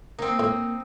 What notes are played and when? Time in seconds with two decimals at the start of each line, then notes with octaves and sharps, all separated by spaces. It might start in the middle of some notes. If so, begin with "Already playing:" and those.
0.19 A#3 C4 D#4
0.39 A2 A#3